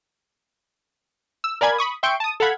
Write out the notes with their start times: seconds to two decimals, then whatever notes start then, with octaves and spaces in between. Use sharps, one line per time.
1.44 E6
1.61 A#4 D5 F5 G#5 B5 G#6
1.78 B5 C#6 D#6
2.03 E5 G5 C6 C#6 G6 D7
2.20 A5 D#6
2.40 A4 F5 F#5 B5 G#6